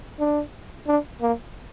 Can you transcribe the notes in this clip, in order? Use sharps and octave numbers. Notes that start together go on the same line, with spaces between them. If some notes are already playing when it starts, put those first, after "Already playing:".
D4
D4
A#3